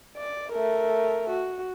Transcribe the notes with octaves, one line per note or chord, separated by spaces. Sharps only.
D5
A3 A#4
F#4